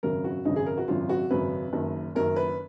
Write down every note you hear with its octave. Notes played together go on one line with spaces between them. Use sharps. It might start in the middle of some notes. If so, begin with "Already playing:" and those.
G#1 F#2 C#3 F#3 A#4
F#4
G#1 F#2 C#3 F#3 D#4
G#4
A#4
F#4
G#1 F#2 C#3 F#3 F4
F#4
G#1 F#2 C#3 F#3 B4
F#1 F#2 D#3
F#1 F#2 D#3 A#4
B4